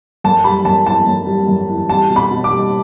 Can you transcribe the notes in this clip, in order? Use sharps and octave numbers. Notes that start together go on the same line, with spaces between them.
F#2 A5
G3 B5
F#2 A5
E3 A5
F#2
G3
F#2
E3
G3 A5
B2
B5
B2
D6
G3